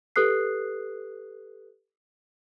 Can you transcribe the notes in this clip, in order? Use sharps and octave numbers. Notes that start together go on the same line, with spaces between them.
G4 A4 B4 D#6 F#6 C7